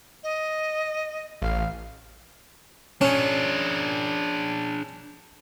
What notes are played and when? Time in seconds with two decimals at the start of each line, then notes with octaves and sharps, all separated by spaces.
0.23 D#5
1.42 A1 F5
3.01 C#4 D4 G#4